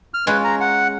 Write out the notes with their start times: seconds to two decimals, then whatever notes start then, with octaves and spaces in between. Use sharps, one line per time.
0.14 F6
0.27 G#3 C#4 F4 B4
0.44 A#5
0.60 F#5